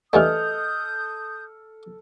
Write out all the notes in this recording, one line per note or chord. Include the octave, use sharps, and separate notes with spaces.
G2 E3 A3 A4 D#5 D#6 F6 G6